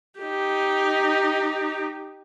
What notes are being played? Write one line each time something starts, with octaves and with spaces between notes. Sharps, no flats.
D#4 G4